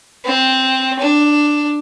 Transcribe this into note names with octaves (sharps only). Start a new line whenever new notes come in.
C4
D4